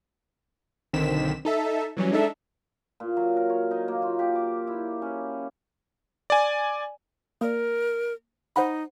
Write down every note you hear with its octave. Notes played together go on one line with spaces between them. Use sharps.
B1 D3 D#3 C4 B6 E7
D#4 A4 E5
E3 F#3 G3 C#4
G#3 D4 D#4 A4 E5
A#2
F#3
A#4
C#5
D#4
A#3
F4
G4
D6
E4
C#4
D5 G#5
A#3 A#4 D5
D#4 C5 F#5 B5